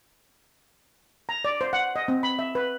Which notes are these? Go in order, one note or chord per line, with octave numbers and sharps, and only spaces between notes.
A#5
D5
C5
F#5
D#5
C4
B5
E5
B4